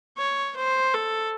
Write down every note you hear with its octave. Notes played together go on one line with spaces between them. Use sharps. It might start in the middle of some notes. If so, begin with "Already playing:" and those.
C#5
C5
A4